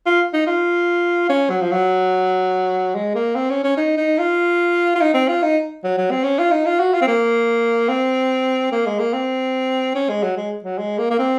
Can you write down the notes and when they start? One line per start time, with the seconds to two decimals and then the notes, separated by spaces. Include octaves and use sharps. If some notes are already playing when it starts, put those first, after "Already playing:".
0.06 F4
0.33 D#4
0.47 F4
1.29 C#4
1.50 F#3
1.61 F3
1.72 F#3
2.95 G#3
3.15 A#3
3.35 C4
3.50 C#4
3.64 C#4
3.77 D#4
3.97 D#4
4.18 F4
4.96 F4
5.01 D#4
5.14 C4
5.28 F4
5.42 D#4
5.84 F#3
5.98 F#3
6.11 C4
6.24 C#4
6.39 F4
6.51 D#4
6.66 F4
6.80 F#4
6.94 F4
7.02 C4
7.08 A#3
7.89 C4
8.72 A#3
8.86 G#3
8.99 A#3
9.13 C4
9.95 C#4
10.09 G#3
10.23 F#3
10.37 G#3
10.64 F#3
10.78 G#3
10.98 A#3
11.10 A#3
11.19 C4